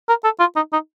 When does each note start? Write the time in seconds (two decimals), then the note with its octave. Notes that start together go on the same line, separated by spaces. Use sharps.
0.09 A#4
0.24 A4
0.40 F4
0.56 D#4
0.73 D#4